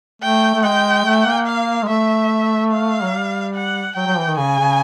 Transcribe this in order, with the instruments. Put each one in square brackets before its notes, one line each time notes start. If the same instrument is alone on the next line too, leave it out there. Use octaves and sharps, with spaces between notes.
[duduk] A3 [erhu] G5
[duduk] A3
[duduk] G#3 [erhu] G5
[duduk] A3
A#3
[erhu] F5
[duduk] G#3
[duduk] A3 [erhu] E5
[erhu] F5
[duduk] F#3
G3
[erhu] F#5
[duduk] F#3 [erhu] G5
[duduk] F#3
E3
D#3
[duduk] C#3 [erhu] G#5
[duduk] C#3